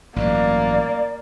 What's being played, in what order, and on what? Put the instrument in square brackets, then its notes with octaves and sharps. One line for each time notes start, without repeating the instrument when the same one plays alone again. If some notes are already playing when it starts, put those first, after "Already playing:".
[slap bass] A1 G2 F#3 [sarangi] A#3 [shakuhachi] D5